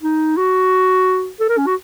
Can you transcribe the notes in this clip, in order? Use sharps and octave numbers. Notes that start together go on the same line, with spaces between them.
D#4
F#4
A4
A#4
C#4
F#4